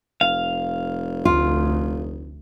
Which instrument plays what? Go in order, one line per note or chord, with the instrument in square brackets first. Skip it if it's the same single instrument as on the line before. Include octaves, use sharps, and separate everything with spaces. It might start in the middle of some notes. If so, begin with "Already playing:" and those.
[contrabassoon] F1 [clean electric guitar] F5
[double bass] D2 [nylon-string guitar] F4